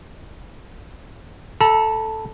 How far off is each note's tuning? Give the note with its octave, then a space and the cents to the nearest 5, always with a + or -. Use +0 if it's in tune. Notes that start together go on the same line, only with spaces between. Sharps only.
A4 +0 A#5 +45